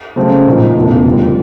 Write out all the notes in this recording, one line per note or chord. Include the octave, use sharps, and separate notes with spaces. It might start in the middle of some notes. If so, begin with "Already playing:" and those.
C#3 F#3 A3 C4
A#1 A#2 F3 A#3 D#4
E1 E2 C#3 E3 A3
F#1 F2 D3 G3